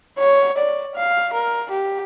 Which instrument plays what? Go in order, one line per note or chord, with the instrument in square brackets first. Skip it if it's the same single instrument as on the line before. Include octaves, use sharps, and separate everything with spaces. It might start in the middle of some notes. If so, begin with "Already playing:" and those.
[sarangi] C#5
D5
F5
A#4
G4